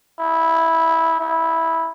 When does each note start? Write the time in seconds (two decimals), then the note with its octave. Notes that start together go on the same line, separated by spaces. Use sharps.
0.20 E4
1.20 E4